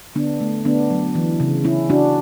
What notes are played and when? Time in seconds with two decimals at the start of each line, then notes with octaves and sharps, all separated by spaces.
0.15 D3 B3 D4
0.40 A3
0.65 D3 B3 D4
0.90 F#3
1.15 E3
1.40 C#3
1.64 C#3 C#4 E4
1.89 C#3 D4 F#4